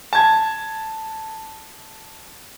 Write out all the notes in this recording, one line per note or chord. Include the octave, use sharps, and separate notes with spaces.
A5 G#6